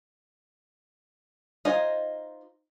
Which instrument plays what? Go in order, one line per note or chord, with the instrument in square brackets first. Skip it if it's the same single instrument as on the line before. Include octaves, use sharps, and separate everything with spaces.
[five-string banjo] D#4 F4 C5 D#5 G#5